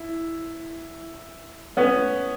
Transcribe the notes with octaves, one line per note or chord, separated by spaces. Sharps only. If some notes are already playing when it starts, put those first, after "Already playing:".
Already playing: E4
B3 C#4